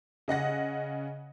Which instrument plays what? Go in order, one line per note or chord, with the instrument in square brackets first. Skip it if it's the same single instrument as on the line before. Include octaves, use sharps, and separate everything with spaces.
[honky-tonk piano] C#3 D#5 F#5 A#6